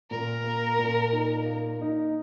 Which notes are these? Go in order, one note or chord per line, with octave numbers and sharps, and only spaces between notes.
A#2 A#4
A#3
A#2
D#4
A#3
D#4